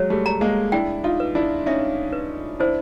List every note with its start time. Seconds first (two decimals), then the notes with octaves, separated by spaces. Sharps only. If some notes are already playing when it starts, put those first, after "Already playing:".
Already playing: F#3 G#3 C#5
0.10 G3 A3
0.26 A#5
0.41 G#3 A#3
0.72 D4 E4 G5
1.04 D#4 F4
1.20 B4
1.35 D4 E4
1.66 C#4 D#4 E5
2.13 B4
2.60 D4 E4 C5